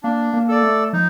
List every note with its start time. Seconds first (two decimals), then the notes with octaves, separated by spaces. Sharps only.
0.03 A#3 D4
0.33 A#3
0.48 A4 D5
0.63 A3
0.93 F3 D#4